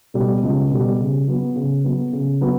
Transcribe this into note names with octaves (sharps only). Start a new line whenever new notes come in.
B2 G3
C#2
B2 G3
C#3
F#3 B3
C#3
F#3 B3
C#3
F#3 B3